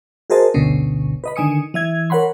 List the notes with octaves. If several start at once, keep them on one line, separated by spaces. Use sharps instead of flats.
F#4 G#4 A#4 C5 D#5 A5
G1 D2 B2 D3 C#4
B4 D#5 B5
D3 D#3 G#5 D#6 C#7
E3 E5 G#6
A#4 C#5 F#5 B5 C6